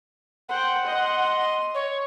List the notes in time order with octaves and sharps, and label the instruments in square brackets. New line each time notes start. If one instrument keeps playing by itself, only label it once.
[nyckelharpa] C5 G5 [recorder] F#5
[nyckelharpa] D#5 C6
[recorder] C#5